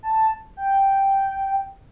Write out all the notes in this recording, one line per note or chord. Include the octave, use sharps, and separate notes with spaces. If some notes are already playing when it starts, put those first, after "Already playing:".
A5
G5